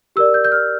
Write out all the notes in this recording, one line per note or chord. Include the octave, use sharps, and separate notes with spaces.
G4 A#4 D5 E6
G6
G6
F6